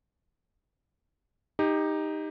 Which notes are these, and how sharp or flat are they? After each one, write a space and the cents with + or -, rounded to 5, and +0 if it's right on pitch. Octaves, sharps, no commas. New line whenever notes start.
D#4 +0 G4 +20